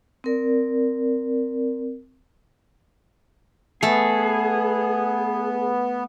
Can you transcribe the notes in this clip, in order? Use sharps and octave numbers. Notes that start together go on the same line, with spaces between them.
C4 A#4 D5
A3 B3 G#4